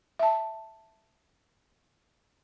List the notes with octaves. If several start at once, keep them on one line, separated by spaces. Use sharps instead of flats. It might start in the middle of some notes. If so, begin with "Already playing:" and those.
E5 A5